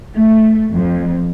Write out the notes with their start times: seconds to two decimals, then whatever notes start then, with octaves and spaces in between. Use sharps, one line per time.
0.14 A3
0.74 F2